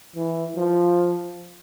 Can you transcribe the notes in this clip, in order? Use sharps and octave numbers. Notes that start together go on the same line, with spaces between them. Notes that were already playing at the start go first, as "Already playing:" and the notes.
E3
F3